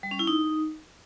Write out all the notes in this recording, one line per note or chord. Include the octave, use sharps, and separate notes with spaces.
G3
C#4
E4
D#4